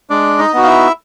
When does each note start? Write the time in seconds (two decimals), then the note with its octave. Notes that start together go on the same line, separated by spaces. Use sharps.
0.10 G#3 D4 D5
0.39 D#4 D#5
0.53 B3 D#4 F#4
0.63 F5
0.67 E4 E5